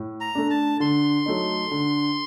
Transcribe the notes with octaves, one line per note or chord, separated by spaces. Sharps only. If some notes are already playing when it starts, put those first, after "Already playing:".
Already playing: A2
A#5
A3 D4
A5
D3 C6
F#3 A3 D#4
D3